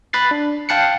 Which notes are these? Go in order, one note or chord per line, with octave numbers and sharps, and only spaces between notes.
B5 F#6 A6 C7
D4
F5 G5 A5 F#6 C7 C#7